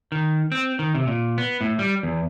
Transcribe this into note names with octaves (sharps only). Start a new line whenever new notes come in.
D#3
C4
D#3
C3
A#2
B3
A2
G3
E2